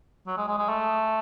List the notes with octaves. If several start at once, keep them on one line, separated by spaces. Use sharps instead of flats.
F#3
G#3
G#3
G#3
A3